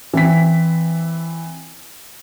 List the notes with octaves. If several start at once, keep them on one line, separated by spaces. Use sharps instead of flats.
E3 C4 B6